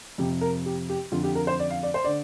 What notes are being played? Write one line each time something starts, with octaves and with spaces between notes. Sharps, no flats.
F2 C3 G4
A#4
G4
G4
F2 D3 F4
G4
A#4
C5
D5
F5
D5
C5
D3 D5